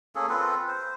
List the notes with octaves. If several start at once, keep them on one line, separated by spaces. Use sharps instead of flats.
A#3 C#4 G#4 A4
C4 F4 A4 B4
C5